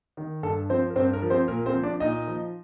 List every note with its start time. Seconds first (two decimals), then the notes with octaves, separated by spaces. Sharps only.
0.17 D#3
0.43 G2 A4 A5
0.69 F3 C4 C5
0.90 A#4
0.96 G2 C4 C5
1.13 A#4
1.22 F3
1.30 C4 C5
1.48 A#2 A#4
1.66 C4 C5
1.74 F3
1.83 D4 D5
2.00 A#2 D#4 D#5
2.28 F3